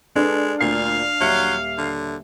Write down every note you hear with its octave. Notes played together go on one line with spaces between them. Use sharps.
G#3 D4 A4 B4
D2 A#2 F5 C7
D#1 F#3 E5 C#7
D3